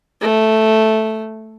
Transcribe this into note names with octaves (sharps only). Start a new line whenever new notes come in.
A3